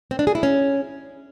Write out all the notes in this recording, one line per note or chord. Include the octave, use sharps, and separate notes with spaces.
C4
D4
G#4
E4
C#4